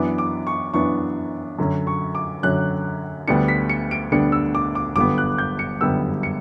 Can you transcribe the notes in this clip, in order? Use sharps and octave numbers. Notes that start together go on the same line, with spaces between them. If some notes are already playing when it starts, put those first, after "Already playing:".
Already playing: F#2 E3 B3 D4 D6
D6
C#6
F#2 E3 B3 D4 C#6
F#2 D3 F#3 C#4
C#6
D6
F#2 D3 F#3 C#4 F#6
D2 D3 G3 B3 D4 C#7
B6
C#7
D7
D2 D3 G3 B3 D4 C#7
E6
D6
D6
G1 F#2 D3 G3 B3 D6
F#6
G6
C#7
G1 F#2 D3 G3 B3 E6
C#7